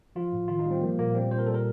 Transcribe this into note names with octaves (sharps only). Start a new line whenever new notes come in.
F3 F4
A2
D#3 F4
D#4
G3 C4
F3 A#3
A#2 A#3
G3 C4
A#2 C5
A#4
G3 A4
A#4